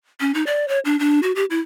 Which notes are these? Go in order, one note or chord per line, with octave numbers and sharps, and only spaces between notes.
C#4
D#4
D5
C#5
D4
D4
F#4
G4
E4